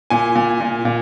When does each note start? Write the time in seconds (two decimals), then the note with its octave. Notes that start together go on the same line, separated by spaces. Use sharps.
0.10 A#2 G#5
0.35 A#2
0.60 A#2
0.85 A#2